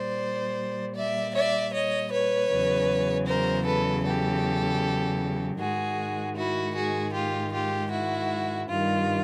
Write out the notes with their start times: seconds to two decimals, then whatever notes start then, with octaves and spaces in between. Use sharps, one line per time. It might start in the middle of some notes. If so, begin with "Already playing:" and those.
Already playing: A#2 G3 C5 D5
0.95 D5 E5
1.33 D5 E5
1.72 C#5 D#5
2.11 B4 C#5
2.49 E2 C#3 F#3
3.26 A#4 C5
3.65 A4 B4
4.04 G4 A4
5.58 G#2 D#3 G#3 F#4 G#4
6.35 E4 F#4
6.74 F#4 G#4
7.12 F4 G4
7.51 F4 G4
7.90 E4 F#4
8.68 G2 D#3 G3 F4